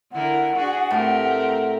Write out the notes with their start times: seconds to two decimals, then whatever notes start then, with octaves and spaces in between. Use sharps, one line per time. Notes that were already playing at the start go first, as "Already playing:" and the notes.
0.12 D3 E4 A#4 F#5
0.56 D4 F#4 G#4
0.90 A2 C4 G4 A#4